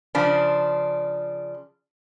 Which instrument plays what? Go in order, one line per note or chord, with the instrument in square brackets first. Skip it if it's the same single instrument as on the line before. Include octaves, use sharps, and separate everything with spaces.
[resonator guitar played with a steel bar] C#3 F3 D4